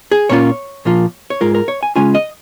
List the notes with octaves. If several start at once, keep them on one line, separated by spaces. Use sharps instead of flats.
G#4
A#2 A#3 C#4 F4 C#5
A#2 F3 A#3 F4
C#5
G#2 G#3 F4 A#4
A#4
C#5
G#5
C#3 G#3 C#4 F4 G#5
D#5